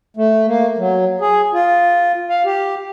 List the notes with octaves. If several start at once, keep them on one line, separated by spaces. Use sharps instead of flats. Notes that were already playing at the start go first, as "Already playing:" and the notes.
A3
A#3
F#3
G#4
F4
F5
G4